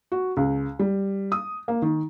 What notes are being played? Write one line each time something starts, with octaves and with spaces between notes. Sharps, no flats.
F#4
C#2
G3
D#6
A#3
D#3